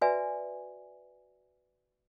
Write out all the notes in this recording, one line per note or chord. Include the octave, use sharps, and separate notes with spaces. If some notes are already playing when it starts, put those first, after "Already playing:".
F#4 B4 D5 E5 G#5